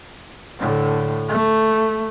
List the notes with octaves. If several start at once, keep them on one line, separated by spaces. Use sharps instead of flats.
A2 D3
A3